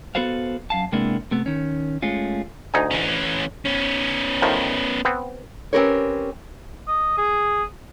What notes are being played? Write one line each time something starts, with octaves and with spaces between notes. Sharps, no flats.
B3 F#4 A4 B4 C5 F5
F#2 F5 A5
C3 G#3 A#3 B3 D4 E4
C3 A3 B3
D#3 C#4
G#3 A3 C#4 F4
D2 D#4 G#5
E3 C#4
B3 C#4
A2 D#3 F3
B3 C4
C4 C#4 G4 A#4 B4 C#5
D#5
G#4